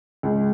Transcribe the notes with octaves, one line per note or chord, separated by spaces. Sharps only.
C#2